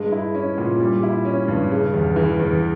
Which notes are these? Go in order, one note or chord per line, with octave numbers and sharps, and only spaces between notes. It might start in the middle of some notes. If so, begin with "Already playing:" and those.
Already playing: G2 G#3
E4
C#4
A#2
G3
E4
C#4
G2
C#3
E2
E3
E2